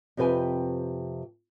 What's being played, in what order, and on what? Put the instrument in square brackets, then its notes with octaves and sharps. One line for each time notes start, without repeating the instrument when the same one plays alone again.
[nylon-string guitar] F2 C3 G4 B4 G5 G#5